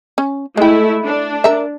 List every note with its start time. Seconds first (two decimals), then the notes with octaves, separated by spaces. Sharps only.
0.18 C#4
0.57 G#3 A3 E4 G5
1.06 D4
1.44 A#4 E5